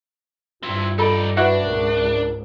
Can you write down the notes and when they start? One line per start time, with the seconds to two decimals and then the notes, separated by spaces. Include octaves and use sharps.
0.63 G2 C4 E4 F4
0.98 D#4 A4 D5 B5
1.37 D4 E4 F#4 B4 F#5
1.65 C#2 G#2 A#4